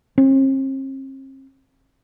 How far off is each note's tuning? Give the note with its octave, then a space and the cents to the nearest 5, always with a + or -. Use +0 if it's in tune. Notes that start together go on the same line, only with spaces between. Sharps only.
C4 +45